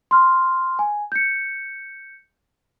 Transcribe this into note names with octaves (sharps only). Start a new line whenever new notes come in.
C6 F6
G#5
G6 C#7